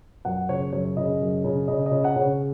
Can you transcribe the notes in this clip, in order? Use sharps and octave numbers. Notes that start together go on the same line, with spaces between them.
F#2 F#5
C#3 C#5
F#2 C#5
C#3 D#5
F#2
C#3
C#3 D#5
D#5
C#3
F#5
C#3
C#5